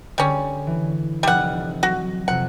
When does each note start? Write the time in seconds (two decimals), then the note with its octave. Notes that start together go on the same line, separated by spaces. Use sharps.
0.18 D3 G3 C#4 G#4
0.67 E3
1.23 F1 G3 D#5 F#5 F6
1.83 F#3 F#4
2.28 F2 C3 F#5